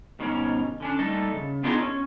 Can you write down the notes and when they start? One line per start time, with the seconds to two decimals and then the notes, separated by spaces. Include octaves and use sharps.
0.19 G#2 B2 D#3 G3 C#4 A#4
0.80 D3 C#4 D4
0.99 G3 A3 A#3 D#4 A4 D#5
1.33 C#3
1.63 B3 D4 D#4 F4 G#4 A#4
1.81 C#4